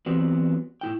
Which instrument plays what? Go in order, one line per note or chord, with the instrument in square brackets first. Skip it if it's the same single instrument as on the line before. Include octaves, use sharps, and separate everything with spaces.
[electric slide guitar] E3 F#3 G3 B3 C4 F#4
A2 E4 G5